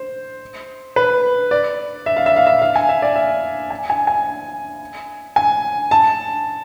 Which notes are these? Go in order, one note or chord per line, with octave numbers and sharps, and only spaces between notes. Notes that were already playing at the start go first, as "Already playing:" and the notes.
Already playing: C5
B4
D5
E5
F5
E5
F5
E5
F5
G#5
E5
D5
E5
G#5
G#5
G#5
G#5
A5